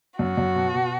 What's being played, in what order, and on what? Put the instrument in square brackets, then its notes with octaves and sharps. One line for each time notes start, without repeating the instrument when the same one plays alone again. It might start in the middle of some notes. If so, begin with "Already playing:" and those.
[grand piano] F#2 [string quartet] F#4
[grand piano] F#2
B2
B2